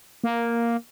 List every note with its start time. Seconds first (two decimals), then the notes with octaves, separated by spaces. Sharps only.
0.24 A#3